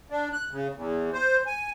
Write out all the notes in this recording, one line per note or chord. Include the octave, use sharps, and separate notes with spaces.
D4
F#6
C#3
E2
C5
G#5